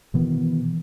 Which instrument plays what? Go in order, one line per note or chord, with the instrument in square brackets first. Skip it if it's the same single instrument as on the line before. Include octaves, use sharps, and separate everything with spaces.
[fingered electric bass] B2 D#3 E3 B3